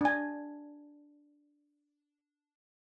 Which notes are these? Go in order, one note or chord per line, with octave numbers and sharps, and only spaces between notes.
D4 G#5